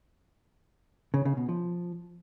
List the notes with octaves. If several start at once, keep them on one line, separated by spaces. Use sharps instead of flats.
C#3
C#3
B2
F3